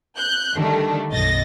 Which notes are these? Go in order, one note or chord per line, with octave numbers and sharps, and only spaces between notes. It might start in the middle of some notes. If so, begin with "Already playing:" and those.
F#6 G6
D3 D#3 G3 A3 D4
B1 F#2 D#5 A6 A#6